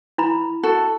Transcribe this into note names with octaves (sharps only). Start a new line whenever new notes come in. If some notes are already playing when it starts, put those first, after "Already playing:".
E4 A#5 B5
F#4 A4